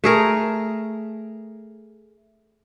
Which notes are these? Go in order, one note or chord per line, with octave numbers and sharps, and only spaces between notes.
A3 G#4 A#4